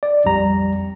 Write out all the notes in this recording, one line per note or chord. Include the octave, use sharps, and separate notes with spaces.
D5
A#1 F2 G3 A#5